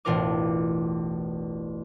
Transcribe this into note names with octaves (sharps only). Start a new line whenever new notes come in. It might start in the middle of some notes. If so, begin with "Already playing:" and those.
E1 A1 D4 F4 A#4 D6